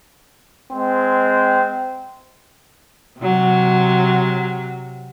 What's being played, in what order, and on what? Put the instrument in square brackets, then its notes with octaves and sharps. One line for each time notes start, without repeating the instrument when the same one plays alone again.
[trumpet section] G#3 C4
[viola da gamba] C3 F#3